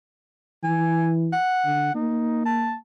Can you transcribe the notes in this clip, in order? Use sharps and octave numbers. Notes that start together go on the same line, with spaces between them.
E3 G#5
F#5
D3
A#3 D#4
A5